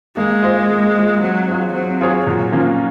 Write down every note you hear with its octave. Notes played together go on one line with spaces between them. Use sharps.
G#3 A#3
F4 C5 D#5
A#3
F4 C5 D#5
F#3 C4
F4 G#4 C#5
F#3 C4
F4 G#4 C#5
A#2 F#3
F3 A#3 C#4